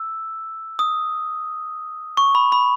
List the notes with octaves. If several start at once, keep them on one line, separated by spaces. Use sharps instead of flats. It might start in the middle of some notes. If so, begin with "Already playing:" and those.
Already playing: E6
D#6
C#6
B5
B5